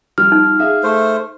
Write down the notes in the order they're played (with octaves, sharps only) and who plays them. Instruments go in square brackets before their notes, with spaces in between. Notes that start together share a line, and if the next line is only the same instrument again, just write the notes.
[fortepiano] F3 G3 G4 [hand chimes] F6
[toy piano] D#4
[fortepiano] G#4 E5 F5
[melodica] A3 C5